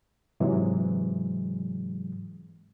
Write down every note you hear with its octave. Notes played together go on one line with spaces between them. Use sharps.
G#2 C3 E3 F#3 G#3